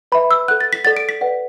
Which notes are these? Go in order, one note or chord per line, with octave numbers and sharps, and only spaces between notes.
B4 E5 B5
E6
A4 F#5 F#6
A6
B6
A4 D5 F#5 A6
D7
B6
B4 D5 F#5